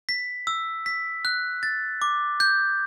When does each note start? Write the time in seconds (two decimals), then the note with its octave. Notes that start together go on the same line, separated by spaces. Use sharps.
0.09 B6
0.47 E6
0.86 B6
1.25 F#6
1.63 A6
2.02 D6
2.40 G6